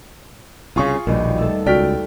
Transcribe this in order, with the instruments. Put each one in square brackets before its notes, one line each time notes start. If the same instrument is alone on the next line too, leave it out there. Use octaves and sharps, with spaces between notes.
[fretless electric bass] C2 C#3 [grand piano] F4 G#4 C#6
[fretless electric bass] A#1 [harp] D#2 B2 G3
[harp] A3 A4
[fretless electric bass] C#2 [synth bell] F#4 D5 [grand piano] G5 F6 B6